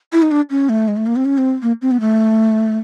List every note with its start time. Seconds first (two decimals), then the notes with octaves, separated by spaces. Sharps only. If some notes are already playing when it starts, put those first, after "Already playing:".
0.13 E4
0.22 D#4
0.31 D4
0.50 C#4
0.69 A3
0.88 G#3
0.97 A3
1.07 A#3
1.16 C4
1.25 C#4
1.38 C4
1.62 A#3
1.82 C4
1.91 B3
2.00 A3